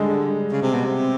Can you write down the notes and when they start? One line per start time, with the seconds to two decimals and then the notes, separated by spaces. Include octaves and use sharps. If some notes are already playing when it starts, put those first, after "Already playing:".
Already playing: D3 G3 G#3
0.52 C#3
0.62 C3
0.74 B2
0.85 C3